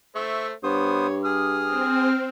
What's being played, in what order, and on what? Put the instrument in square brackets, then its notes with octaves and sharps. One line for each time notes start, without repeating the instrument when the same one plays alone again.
[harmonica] A3 C5 [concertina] E5 C#6
[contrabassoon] G2 [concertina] B3 C5 D#6 [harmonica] C#5
[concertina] G#4 D#6 [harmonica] F6
[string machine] C4